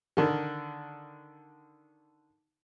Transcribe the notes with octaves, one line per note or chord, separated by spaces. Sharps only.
D3 D#3